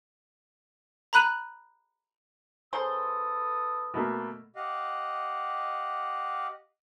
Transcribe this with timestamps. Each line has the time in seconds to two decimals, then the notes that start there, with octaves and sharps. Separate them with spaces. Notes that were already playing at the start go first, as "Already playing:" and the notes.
1.13 A#5 B5 F#6 D#7 F#7
2.73 C#3 A4 B4 C5 C6 D#6
3.94 B2 A3 A#3
4.56 G4 D#5 F5 F#5